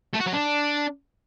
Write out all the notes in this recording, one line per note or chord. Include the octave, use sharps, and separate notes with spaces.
A3
F#4
F#3
D4